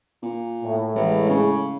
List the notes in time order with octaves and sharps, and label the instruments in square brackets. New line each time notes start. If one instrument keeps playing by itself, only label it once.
[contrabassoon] A#2
[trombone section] A2
[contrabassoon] A1 [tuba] G#3
[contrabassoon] C#3